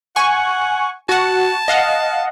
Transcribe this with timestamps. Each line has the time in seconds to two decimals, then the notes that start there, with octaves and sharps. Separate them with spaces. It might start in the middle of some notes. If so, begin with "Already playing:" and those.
0.16 F#5 G#5 C#6
1.09 F#4 F#5 A5
1.68 D#5 F5 F#5